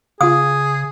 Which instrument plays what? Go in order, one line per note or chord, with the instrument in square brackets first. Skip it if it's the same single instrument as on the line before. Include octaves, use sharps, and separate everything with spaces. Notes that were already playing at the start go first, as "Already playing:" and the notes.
[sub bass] C#3 [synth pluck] F4 F5 [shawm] G#4 [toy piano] D#6